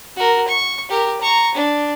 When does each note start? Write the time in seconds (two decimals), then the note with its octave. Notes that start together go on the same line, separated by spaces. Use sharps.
0.17 F#4 A#4
0.48 C#6
0.90 G4 A#4
1.21 A#5 C#6
1.55 D4